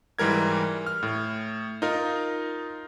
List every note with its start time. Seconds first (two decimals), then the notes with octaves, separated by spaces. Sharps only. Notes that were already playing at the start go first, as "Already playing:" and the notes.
0.19 G#2 E3 G3 A#4 G#6
0.86 F6
1.03 A2
1.82 D#4 F4 A#4